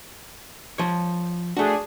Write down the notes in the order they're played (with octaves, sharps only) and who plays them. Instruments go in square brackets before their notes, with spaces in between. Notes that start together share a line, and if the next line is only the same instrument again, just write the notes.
[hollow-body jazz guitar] F3 C#5
[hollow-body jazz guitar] A3 F#4 [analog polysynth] D4 G#4